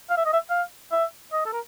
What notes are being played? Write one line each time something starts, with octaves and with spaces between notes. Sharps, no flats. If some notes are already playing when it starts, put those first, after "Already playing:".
F5
E5
D#5
E5
F5
E5
D#5
A4
A#4